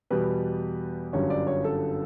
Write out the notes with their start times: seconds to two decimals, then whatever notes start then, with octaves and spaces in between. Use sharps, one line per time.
0.11 E2 B2 G3 B4
1.13 G1 F#2 D3 G3 C#5
1.30 D5
1.47 C#5
1.64 A4